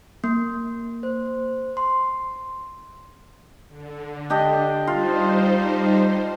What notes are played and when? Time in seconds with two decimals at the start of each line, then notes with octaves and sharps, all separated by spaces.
0.24 A#3
1.03 C5
1.77 C6
3.69 D3
4.30 D4 G4 D#5
4.87 G3 D#4 F4 C5